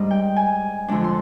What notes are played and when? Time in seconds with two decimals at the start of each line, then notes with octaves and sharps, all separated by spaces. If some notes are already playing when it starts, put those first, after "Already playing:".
Already playing: G#2 G3 D4 D#5
0.11 G5
0.36 G#5
0.88 F2 D3 G#3 D4
1.04 C6